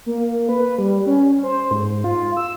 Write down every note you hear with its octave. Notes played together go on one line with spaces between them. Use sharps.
A#3
B4
G3
C#4
C5
G#2
F4
E6